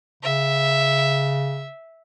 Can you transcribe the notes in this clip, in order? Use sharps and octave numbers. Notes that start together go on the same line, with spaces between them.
C#3 E5